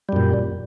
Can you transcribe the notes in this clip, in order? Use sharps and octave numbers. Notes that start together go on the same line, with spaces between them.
F#2 A#2 G3